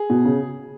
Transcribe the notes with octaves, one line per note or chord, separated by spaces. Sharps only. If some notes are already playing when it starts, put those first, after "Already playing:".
Already playing: G#4
B2
C#3